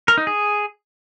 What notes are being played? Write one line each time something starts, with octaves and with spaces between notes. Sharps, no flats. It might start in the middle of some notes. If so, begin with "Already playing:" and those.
A#4
D#4
G#4